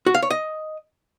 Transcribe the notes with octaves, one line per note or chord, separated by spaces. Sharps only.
F#4
F5
C#5
D#5